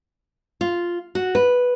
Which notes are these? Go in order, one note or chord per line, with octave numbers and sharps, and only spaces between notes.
F4
F#4
B4